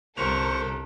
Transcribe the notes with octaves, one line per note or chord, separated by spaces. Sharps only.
G1 C2 A4 A#4 C5 C#6 F7